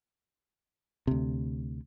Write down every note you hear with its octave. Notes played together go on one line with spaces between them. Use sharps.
D2 C3